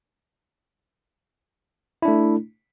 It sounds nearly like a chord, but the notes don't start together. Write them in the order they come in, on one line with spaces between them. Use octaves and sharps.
E4 D4 A3